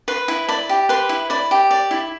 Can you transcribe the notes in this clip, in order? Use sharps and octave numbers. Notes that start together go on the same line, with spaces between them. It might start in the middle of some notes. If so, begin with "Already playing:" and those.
B4 C6
E4
D5 B5
G4
B4 C6
E4
D5 B5
G4
D5
E4